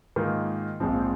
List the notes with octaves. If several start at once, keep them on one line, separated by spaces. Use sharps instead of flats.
G#2 D#3 A#3 F4
A#1 G#2 F3 C4